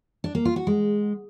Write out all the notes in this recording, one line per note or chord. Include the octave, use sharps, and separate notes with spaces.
D4
A#3
F4
F#4
G#3